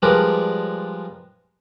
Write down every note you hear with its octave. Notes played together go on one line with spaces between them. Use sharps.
F3 G3 G#3 D4 A#4 B4